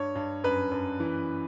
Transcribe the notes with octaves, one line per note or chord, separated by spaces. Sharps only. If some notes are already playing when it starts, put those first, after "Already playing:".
Already playing: G2 C#5
G2
F#2 B4
F#2
E3